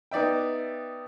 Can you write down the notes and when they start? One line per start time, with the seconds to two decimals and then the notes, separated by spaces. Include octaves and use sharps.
0.11 B3 D#4 D5 E5 G5